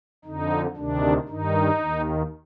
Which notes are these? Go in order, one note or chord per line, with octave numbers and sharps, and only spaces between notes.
F2 D3 D#4
D2 C3 D#3 D4
G2 D#3 D#4
D#2 D#3